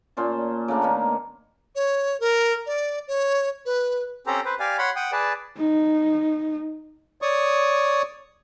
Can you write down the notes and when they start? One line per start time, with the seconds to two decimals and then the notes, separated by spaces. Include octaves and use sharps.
0.17 A#2 C#4 C5 A5
0.68 C#3 A3 A#3 D4
0.81 D#3 A#3 B3 C#4
1.75 C#5
2.20 A#4
2.66 D5
3.08 C#5
3.66 B4
4.27 C4 C#4 G4 A4 C5 A#5
4.45 B4 C5
4.60 G4 D5 F5 G#5
4.78 C#5 F#5 B5 C6
4.96 F#5 G5 D#6
5.12 G#4 B4 D5 A5
5.57 D#4
7.22 C#5 D5 C#6 D#6